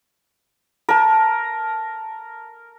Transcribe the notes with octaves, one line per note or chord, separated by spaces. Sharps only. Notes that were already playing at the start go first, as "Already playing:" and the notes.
A#4 A5